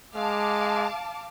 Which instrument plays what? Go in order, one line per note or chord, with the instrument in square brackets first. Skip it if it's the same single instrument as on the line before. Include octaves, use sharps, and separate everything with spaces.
[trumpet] G#3 [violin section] F5 A5 D6